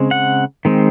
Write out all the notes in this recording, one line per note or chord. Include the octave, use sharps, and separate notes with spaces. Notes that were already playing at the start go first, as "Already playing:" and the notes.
Already playing: C#3 G#3 C4
F#5
D#3 G#3 C4